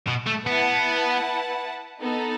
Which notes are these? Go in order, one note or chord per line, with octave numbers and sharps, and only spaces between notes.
B2
A3
B3 E4 B4 F#5 A5
B3 D#4 A4